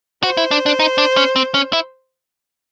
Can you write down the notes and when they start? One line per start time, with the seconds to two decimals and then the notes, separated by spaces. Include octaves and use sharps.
0.23 F#4 C5
0.37 E4
0.51 D4
0.66 D4
0.79 D#4
0.98 D4
1.17 C#4
1.36 C4
1.54 C#4
1.73 E4